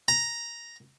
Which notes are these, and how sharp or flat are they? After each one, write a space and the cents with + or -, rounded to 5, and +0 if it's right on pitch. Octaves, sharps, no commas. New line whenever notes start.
A#5 +5